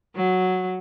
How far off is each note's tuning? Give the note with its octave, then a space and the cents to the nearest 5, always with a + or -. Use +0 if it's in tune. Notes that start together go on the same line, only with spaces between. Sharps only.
F#3 -5